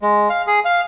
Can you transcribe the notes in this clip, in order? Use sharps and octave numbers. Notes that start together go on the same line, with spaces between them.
G#3
F5
G#4
F5